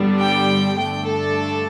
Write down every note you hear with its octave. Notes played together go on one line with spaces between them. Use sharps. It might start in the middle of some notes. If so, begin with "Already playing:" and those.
Already playing: G2 D3 G3 B3 D4
G5
G2 D3 A3 D4 G5
A4